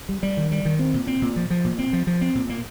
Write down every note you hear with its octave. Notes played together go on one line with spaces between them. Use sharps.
G3
G3
D#3
G3
D#3
C4
A#2
C4
A#2
F3
F3
A#2
C4
F3
F3
C4
A#2
A#3